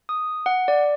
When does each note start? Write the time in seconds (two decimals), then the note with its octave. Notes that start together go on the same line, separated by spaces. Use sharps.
0.09 D#6
0.46 F#5
0.68 D5